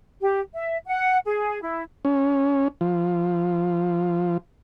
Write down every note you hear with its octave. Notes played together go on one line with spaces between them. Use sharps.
G4
E5
F#5
G#4
E4
C#4
F3